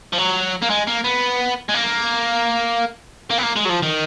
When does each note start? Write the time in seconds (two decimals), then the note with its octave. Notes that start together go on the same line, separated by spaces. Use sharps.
0.13 F3
0.18 F#3
0.62 A#3
0.70 G#3
0.87 A#3
1.04 B3
1.69 G#3
1.74 A#3
3.30 A#3
3.38 B3
3.43 A#3
3.56 G#3
3.65 F#3
3.70 F3
3.83 D#3